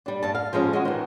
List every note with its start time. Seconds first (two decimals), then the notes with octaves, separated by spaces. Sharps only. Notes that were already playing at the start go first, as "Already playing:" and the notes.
0.06 G3 D4
0.22 G2 A5
0.35 F5
0.53 F3 G3 G#3 C#4
0.73 G#3 F#4
0.85 D#3 E3